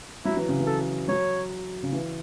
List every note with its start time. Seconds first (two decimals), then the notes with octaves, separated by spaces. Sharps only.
0.25 F#3 E4
0.37 E3
0.48 C#3
0.60 E3
0.67 A4
1.08 F#3 C#5
1.83 C#3
1.93 E3